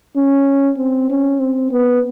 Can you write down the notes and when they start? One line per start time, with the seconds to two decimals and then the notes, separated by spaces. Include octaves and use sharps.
0.17 C#4
0.78 C4
1.10 C#4
1.41 C4
1.71 B3